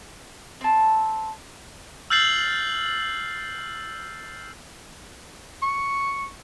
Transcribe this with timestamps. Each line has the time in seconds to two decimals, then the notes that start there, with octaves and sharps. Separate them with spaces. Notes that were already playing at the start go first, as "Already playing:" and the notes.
0.61 C4 A5
2.10 E6 F6 G6 A6 C7 F#7
5.62 C#6